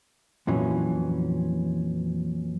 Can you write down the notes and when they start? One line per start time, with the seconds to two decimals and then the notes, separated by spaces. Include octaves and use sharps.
0.47 F2 A#2 E3 F#3 C#4